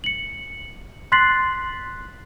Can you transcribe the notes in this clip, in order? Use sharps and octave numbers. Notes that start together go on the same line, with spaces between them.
C#7 F#7
C6 F#6 A6 B6 C7 F#7